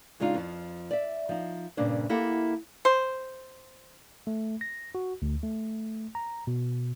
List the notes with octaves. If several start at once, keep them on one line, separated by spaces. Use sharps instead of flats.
C#3 G#3 D4 D#4 F4
F2 F3
D5 E5
F3 D#4
G2 A#2 C#3 D4 C5
A#3 E4 G4 A4 F#5
C5
A3
A#6
F#4
D2
A3
A#5
B2